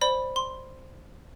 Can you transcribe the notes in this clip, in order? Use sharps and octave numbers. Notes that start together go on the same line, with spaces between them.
C5 D5 B5
C6